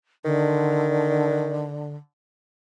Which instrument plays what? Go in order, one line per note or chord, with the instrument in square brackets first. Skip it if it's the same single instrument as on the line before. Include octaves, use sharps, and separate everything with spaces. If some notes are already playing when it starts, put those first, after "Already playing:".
[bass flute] D3 [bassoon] D#3